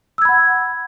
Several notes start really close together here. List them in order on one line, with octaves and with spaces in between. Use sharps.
E6 G#6 B5 F#5